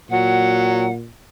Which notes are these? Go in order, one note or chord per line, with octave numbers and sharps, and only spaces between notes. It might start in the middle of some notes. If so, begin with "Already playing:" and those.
A#2 F#3 F#5